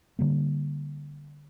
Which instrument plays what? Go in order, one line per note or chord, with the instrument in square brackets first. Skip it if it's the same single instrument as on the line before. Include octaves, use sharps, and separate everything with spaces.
[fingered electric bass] D3 G3 A#3